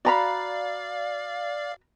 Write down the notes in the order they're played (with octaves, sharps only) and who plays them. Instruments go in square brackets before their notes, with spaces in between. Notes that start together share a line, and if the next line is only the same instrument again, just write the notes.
[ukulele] F#4 A#5 B5 [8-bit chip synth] D5 F5